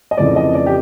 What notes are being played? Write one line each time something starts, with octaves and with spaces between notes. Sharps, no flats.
D#5
F2 C#3 E3 A3 D5
D#5
D5
G4